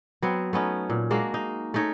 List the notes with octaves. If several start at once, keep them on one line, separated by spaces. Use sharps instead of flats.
F#3 B3 C4
A3 B3 C#4 D#4
A#2
G#3 A#3 D4 F#4
D#4
A3 C#4 D#4 C#5